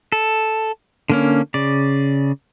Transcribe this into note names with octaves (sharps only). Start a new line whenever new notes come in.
A4
D3 A#3 C#4
C#3 D5